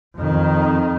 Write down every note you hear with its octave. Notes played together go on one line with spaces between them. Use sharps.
F2 D#3